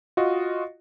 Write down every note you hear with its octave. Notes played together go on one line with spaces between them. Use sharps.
F4 F#4 D#5